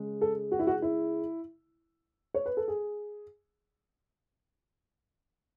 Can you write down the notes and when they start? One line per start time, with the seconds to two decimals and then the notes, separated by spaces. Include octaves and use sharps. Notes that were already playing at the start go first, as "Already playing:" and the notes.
Already playing: C#3 G#3
0.21 A4
0.52 F#4
0.59 E4
0.67 F#4
0.82 E4
2.34 C#5
2.46 B4
2.57 A4
2.68 G#4